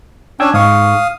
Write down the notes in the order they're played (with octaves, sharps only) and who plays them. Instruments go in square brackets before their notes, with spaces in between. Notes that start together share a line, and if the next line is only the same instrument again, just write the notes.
[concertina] C#4 D4 [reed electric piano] G5 E6 G#6
[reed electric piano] G#2 C#6 [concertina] F5 D#6